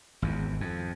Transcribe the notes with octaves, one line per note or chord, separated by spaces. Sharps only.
G#1 E2
F2